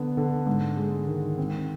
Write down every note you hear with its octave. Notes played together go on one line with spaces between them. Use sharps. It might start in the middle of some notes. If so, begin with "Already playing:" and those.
Already playing: D3 B3
D3
G#2
G#3
D#3
C4